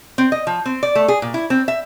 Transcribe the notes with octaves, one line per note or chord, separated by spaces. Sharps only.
C4
D#5
F3
C4
D5
A3
G#4
A#2
E4
C4
E5